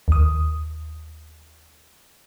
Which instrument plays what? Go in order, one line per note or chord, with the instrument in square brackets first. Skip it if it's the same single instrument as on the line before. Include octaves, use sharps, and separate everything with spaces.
[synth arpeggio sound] D#2 D#6